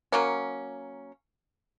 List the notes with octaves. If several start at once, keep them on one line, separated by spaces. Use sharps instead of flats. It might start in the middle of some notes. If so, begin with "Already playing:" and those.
F#3 A#3 C#4